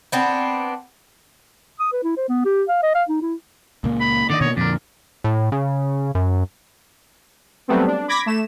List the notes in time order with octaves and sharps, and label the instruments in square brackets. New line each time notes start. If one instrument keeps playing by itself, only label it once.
[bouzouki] B3 C4 D4
[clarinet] D#6
B4
E4
C5
B3
G4
F5
D#5
F5
D#4
E4
[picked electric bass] C#2 A#2 A#3
[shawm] B5
[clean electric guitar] D3 D#3 D#5 [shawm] D5
[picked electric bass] B2 A#3 [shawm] C#5
[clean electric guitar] F2 A#4 [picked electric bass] A#2 D3 [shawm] D4
[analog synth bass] A2
C#3
F#2
[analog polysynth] F#3 G3 A3 B3 C4
D4
B5 D6 G#6 A#6 B6
A3 E7